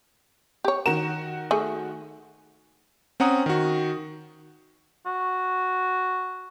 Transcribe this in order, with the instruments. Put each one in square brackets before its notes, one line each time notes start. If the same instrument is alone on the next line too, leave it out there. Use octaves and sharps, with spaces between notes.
[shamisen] G4 C#5
[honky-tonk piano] D#3 F#4 E7 [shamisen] A#4
[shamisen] A3 G#4
[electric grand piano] C4 C#4 F#5 A#5 D#6
D#3 F#4
[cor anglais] F#4